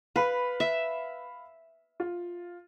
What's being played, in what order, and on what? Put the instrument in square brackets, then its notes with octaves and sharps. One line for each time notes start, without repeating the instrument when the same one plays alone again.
[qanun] B4 [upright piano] F5 B5
[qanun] E5
[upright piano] F4